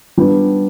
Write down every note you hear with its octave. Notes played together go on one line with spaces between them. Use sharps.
G3 B3 D4